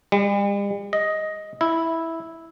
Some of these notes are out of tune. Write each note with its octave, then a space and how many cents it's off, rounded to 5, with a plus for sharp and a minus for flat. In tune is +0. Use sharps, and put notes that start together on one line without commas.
G3 +45
D#5 +10
E4 -5